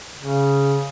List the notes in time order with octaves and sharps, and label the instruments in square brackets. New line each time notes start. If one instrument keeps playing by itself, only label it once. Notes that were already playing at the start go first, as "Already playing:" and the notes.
[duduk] C#3